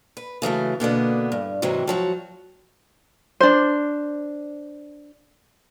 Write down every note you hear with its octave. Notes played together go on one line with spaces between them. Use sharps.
B4
C#3 E3 F#3 A3
B2 D3 A#3 B3
G2
G#2 C3 E3 F#3
F3 F#3 F#4
D4 C5